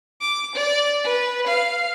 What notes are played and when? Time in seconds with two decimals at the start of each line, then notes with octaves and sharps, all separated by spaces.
0.21 D6
0.55 D5
1.04 B4
1.47 F5